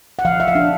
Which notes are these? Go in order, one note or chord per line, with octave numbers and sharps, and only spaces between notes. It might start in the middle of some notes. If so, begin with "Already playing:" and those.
F#5
F3 F5
E5
F5
D4